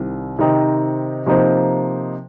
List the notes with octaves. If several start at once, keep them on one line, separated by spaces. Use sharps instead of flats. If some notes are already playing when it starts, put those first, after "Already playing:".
Already playing: C2 C3 D#3
C3 D#3 C4 D#4
C3 F3 A#3 D#4 C5